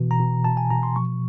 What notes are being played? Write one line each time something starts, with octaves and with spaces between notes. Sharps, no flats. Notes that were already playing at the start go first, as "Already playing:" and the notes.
Already playing: B2 E3
A#5
B2
B2 A5
G#5
B2 A#5
C6
F3 C#6